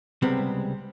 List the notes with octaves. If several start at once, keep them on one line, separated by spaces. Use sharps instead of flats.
C#2 C3 G3 G#3 B3 C4